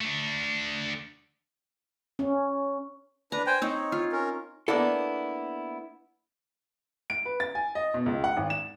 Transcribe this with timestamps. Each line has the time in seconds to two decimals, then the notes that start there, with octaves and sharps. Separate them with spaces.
0.01 A3 D4
2.19 C#4
3.32 D4 B4 A#5
3.47 C5 G5 G#5
3.62 C4 D#4 C#5
3.92 F4
4.12 C#4 A#4
4.68 A#3 B3 D4 E4 A4
7.10 D7
7.25 B4
7.40 A6
7.55 G#5
7.75 D#5
7.94 B2
8.06 C#2
8.24 F#5
8.37 G#1
8.50 E7